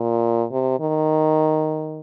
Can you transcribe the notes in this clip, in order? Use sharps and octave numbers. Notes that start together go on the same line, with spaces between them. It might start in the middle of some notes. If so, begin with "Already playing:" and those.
Already playing: A#2
C3
D#3